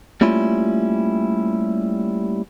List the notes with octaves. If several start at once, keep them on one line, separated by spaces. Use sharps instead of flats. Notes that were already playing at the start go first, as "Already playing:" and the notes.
G3 A3 A#3 C#4 E4 F4